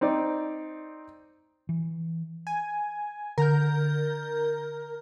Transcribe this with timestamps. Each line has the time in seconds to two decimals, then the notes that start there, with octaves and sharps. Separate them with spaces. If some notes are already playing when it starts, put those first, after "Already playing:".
0.01 C4 D#4 D5
1.69 E3
2.47 G#5
3.38 D3 A#4 A#5 G6